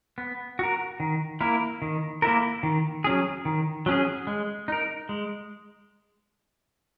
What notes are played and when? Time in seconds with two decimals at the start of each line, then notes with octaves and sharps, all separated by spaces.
0.18 B3
0.59 F#4 A#4
1.00 D#3
1.41 A#3 E4 A#4
1.82 D#3
2.22 A#3 E4 A#4
2.63 D#3
3.04 F#3 C#4 G#4
3.45 D#3
3.86 F#3 C#4 G#4
4.27 G#3
4.68 D#4 A#4
5.09 G#3